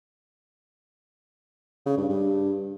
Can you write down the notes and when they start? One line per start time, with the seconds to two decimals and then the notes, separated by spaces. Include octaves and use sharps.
1.86 C#3
1.97 G2
2.09 G2